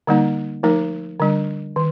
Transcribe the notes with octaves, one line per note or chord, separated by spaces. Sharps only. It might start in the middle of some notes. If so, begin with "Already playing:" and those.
D3 G3 A#3 D#4
F3 A3 D#4 A#4
D3 G3 D4
D#3